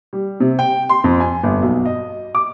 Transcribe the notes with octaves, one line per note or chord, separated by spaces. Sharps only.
G3
C3
G5
C6
F2
G#5
G1
B1
D#5
D6